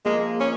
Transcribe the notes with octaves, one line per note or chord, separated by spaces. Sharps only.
F3 G#3 A#3
C#4